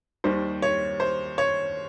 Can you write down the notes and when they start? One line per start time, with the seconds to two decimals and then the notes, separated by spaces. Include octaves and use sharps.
0.24 D#2 D#3 G3 C5
0.62 C#5
1.00 C5
1.38 C#5